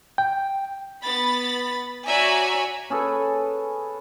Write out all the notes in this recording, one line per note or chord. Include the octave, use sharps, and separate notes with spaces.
G5
B3 B5 A6
F#4 C#5 D5 E5 G#5 A#5
C#4 G#4 A4 B4